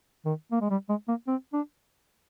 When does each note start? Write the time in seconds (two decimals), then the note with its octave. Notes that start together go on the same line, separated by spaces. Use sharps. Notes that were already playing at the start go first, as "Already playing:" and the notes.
0.25 D#3
0.52 A#3
0.61 G#3
0.70 G3
0.89 G#3
1.08 A#3
1.28 C4
1.53 D4